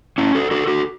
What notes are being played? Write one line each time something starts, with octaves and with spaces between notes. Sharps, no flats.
C#4 E4
F#4 A4
F#4 A4
F#4 A4